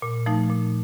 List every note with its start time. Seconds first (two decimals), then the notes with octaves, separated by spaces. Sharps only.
0.02 A#2
0.26 F3 A3 D#4
0.49 A#2